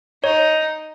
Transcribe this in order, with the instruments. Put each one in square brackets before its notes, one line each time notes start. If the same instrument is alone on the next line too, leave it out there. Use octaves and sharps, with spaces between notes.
[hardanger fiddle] D#4 [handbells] C#5